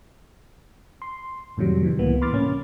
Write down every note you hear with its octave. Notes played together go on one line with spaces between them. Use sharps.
C6
F2 A2 C3 D#3 F#3 G3
C3 E3 G3
C#2 A2 E3 A#3 B3
B5 C6 D6 F6 A6
A2 C3 A#3 C#4